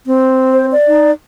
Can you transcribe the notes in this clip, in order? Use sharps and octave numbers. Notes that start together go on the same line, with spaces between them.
C4
C5
D5
D#4